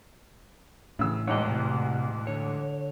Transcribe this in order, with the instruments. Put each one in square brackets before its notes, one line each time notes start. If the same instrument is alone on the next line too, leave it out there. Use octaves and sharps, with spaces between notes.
[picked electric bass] A2 E3 [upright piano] C#3 E6
[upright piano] E1 C2 G#2 [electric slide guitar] C#5 D#5
[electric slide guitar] C3
D3 C#5